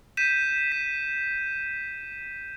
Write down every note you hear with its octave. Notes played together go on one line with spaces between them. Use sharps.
G6 B6 D#7 E7
B6